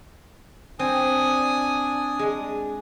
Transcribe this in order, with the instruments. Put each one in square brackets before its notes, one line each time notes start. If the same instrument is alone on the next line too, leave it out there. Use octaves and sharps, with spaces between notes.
[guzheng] C4 [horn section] D4 [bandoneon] G#5 D#6
[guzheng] G#3